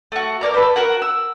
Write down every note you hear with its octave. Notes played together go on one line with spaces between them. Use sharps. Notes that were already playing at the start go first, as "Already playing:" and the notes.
A3 F#4
A#4 C#5 D5 A#5
A4 B4 C5
F#4 A#4 F#5
E6